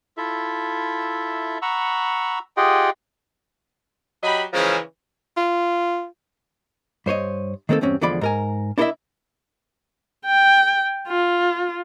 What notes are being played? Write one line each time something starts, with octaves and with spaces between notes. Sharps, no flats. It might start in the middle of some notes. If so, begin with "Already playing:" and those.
E4 F4 A4 E5
F#5 A#5 B5 C#6 E6
F4 G4 G#4 D#5 F#5 G5
F#3 G4 D#5 B5
C#3 E3 F3 G#3 C#4 A#4
F4
G2 C5 C#5 D#5
D#3 A3 A#3 C4 A4
E2 G2 C4 C#4
E2 D3 F3 G#3 D5 B5
G#2 A#4 G#5
D4 E4 A4 A#4 D#5 E5
G5
F4